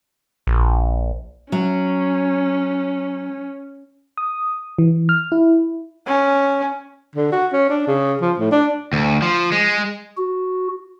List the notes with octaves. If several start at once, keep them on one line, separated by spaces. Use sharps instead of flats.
A#1
F#3 C#4
D#6
E3
F6
E4
C#4
D3
F#4
C#4
D4
C#3
F3
A2
D4
D2
F3
G#3
F#4